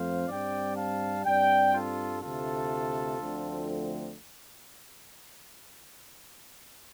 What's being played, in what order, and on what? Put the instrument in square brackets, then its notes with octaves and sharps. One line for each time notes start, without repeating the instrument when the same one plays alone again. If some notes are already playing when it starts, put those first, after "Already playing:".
Already playing: [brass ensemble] F2 F3 A3 C4 C5 F5
G2 G3 C4 D5 G5
F5 A5
G2 G3 C4 D5 G5
F4 A4
D2 C3 A3 F4 A4
D2 D3 F3 A3 C4